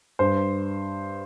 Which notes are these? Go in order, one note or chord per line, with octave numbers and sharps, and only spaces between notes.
G2 C5